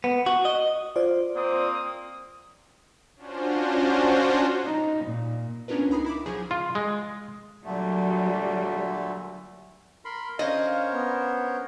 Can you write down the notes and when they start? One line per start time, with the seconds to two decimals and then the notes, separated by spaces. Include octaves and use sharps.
0.04 B3
0.26 F#4
0.45 D#5
0.96 F4 C5 D5
1.35 A#3 C4 D#6
3.16 C#4 D4 F4 F#4 C5
4.64 D#4
5.05 A#2
5.68 B3 C#4 D4 F4 A#4 B4
5.90 C#2 D#4 A#5 B5 D#6 C7
6.05 E4 B5 D6
6.26 C#3 F3 F#3 G#4
6.51 F4
6.75 G#3
7.64 A#2 D3 F#3 G3 A3
10.05 A#4 B5 C6
10.39 C#4 D4 F4 A#4 C5 C#5 D#5 F5
10.93 B3